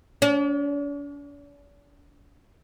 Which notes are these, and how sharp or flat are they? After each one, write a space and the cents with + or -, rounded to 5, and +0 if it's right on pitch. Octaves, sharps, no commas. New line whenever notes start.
D4 -45